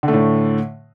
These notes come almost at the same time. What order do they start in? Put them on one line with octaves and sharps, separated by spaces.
D3 A3 A2